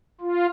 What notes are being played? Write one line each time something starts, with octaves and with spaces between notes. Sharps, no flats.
F4